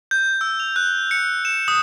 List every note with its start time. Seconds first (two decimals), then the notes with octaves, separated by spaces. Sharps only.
0.11 G6
0.41 E6
0.60 F7
0.76 F#6
1.11 C#7
1.45 E7
1.68 D#6